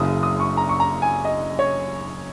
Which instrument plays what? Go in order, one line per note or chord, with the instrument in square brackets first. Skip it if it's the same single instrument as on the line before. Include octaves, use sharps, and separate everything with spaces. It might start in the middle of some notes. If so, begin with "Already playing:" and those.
Already playing: [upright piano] F#1 F#2 C#3 D#6
D#6
C#6
A#5
C#6
A#5
G#5
D#5
C#5